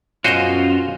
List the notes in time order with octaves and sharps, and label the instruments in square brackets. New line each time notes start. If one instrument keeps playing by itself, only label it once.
[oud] F#2 B2 C#4 [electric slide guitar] F4 [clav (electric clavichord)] F#4 C5 D#5